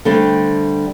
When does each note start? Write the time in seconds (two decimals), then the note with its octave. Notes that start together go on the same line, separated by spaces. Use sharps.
0.05 D3 G3 A3 C4